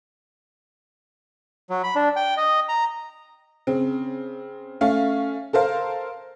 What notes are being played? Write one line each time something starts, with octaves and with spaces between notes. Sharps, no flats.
F#3
B5
D4
G5
D#5
A#5
C#3 C4
A3 C#4 F5
A4 A#4 C5 F5